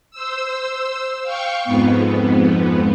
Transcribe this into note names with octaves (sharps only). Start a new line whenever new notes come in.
C5 E6
F5 G5 C#6
F2 G#2 B3